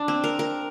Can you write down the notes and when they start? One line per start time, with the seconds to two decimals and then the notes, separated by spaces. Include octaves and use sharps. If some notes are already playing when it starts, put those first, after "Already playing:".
Already playing: D4
0.08 C4
0.24 A#4
0.39 A#4